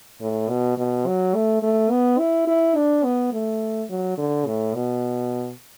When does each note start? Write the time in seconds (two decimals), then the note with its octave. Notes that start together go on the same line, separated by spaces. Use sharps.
0.21 A2
0.49 B2
0.78 B2
1.06 F#3
1.35 A3
1.62 A3
1.91 B3
2.19 E4
2.47 E4
2.76 D4
3.04 B3
3.32 A3
3.90 F#3
4.18 D3
4.46 A2
4.75 B2